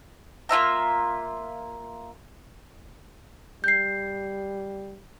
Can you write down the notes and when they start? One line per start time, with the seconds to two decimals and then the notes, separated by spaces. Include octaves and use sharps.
0.49 A#3 F4 E5 A#5
3.64 G3 G6 C7